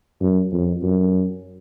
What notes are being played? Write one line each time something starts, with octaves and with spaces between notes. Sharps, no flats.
F#2
F2
F#2